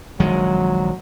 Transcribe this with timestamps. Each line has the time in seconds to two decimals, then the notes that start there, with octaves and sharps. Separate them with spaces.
0.20 A#1 D#3 F#3 G#3